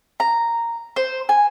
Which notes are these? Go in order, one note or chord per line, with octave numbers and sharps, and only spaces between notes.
A#5
C5
G#5